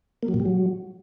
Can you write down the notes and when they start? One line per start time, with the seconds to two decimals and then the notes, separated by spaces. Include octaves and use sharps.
0.23 A#3
0.28 F#3
0.34 A#2
0.40 G3
0.46 F#3